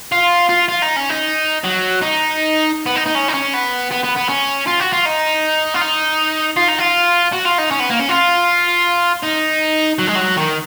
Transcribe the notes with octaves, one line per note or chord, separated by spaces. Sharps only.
F4
F4
F4
D#4
C#4
D#4
F#3
D#4
B3
D#4
D#4
C#4
D#4
C#4
B3
B3
B3
B3
C#4
F4
F#4
F4
D#4
F4
D#4
F4
D#4
F4
F#4
F4
D#4
C#4
B3
A#3
C#4
F4
D#4
F#3
G#3
F#3
D#3